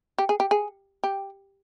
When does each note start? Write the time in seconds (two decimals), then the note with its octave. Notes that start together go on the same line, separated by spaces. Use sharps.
0.18 G4
0.29 G#4
0.40 G4
0.51 G#4
1.03 G4